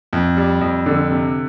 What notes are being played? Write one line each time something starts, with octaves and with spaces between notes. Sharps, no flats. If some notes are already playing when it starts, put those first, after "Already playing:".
F2
G3
F2
D3
C3